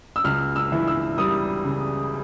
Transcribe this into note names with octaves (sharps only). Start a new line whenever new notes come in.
E6
C#2 F6
E6
E3
E6
G3 D#6
C#3